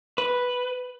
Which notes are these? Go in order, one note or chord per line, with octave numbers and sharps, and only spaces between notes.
B4